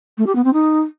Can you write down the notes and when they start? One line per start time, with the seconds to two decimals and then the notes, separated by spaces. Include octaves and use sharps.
0.18 A3
0.27 G4
0.36 B3
0.44 C4
0.53 D#4